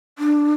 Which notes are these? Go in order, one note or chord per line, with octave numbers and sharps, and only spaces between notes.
D4